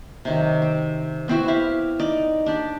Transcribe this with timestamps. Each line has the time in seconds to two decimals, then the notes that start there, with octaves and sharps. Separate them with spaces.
0.25 C3 D#3 F#3
0.62 C4
1.28 B3 C4 E4 F#4
1.48 E4 G4 F5
2.00 D#4 D5
2.46 D4 G4 D5